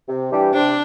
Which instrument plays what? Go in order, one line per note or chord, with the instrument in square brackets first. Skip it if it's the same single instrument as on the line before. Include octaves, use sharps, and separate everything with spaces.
[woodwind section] C3
E3 G3 D4 G4
[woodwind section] C3 [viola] D4